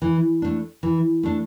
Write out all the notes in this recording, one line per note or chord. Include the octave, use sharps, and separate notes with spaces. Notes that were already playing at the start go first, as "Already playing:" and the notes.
E3
A3 D4
E3
A3 D4